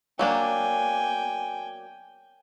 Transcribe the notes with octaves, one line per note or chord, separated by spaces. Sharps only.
F#3 A#3 D4 G5 G#5